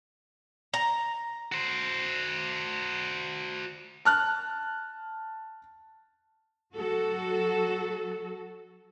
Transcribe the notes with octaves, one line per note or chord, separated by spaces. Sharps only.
A#5
F#4 C5
A5 F6 F#6
F#3 F#4 A4